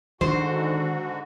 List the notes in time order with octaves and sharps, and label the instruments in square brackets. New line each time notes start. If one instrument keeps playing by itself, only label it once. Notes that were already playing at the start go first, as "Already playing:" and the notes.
[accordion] G#2 D3 F#4 [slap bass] D#3 D4 [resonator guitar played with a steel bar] C5